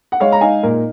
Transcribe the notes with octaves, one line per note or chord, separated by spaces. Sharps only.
F#5
G#3 C#5 F5
A#5
D#4 F5 G#5
A#2 A#4